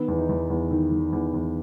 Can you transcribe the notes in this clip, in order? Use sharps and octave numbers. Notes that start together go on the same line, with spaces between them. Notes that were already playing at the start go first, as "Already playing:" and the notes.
Already playing: D#3 B3
E2
D#4
E2
E2
D#3
D#3
E2
E2